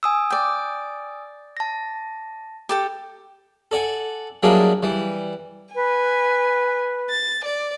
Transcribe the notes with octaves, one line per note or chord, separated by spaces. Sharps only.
G#5 D#6 E6
D5 G5
A5 A#6
G4 A4 G5
A4 D5 F#5 G#5
F#3 G3 A#3 D4 E4 G#4
E3 G3
B4 G#5
A6
D5